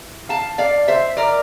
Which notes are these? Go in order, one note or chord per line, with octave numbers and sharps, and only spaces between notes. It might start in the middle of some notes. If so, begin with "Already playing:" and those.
Already playing: E3
F5 A5
D5 F5
C5 E5
A#4 D5